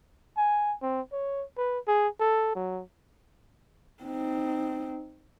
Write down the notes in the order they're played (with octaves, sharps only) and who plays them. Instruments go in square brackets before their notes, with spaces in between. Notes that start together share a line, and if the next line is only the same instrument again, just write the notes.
[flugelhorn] G#5
C4
C#5
B4
G#4
A4
F#3
[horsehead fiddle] C4 D#4